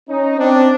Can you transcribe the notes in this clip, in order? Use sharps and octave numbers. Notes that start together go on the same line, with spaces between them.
C#4 D#4
C4 D4